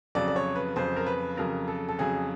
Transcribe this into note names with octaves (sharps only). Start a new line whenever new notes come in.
F2 C#3 F#3 D5
D5
C#5
B4
F2 C#3 F#3 C5
A#4
B4
F2 C#3 F#3 A#4
A4
A4
F2 C#3 F#3 G#4